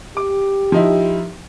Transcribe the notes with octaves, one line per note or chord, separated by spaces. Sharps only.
G4 D6
F3 D#4 E4